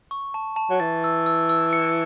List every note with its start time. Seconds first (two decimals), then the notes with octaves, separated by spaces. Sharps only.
0.11 C#6
0.34 A5
0.56 A5
0.70 F#3
0.80 E3 A6
1.04 E6
1.26 E6
1.49 E6
1.73 C#7